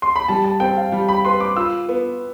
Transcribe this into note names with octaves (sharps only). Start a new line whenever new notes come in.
C6
B5
G3 A5
A5
C4 G5
F5
G3
B5
B4 C6
D6
F4 E6
B3